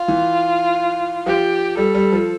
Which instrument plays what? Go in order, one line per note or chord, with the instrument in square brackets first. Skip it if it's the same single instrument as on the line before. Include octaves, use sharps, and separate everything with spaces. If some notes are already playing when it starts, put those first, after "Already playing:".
Already playing: [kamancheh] F4
[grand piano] E3
[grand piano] F3 [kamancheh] G4
[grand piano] G3 [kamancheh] A4
[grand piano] G3
F3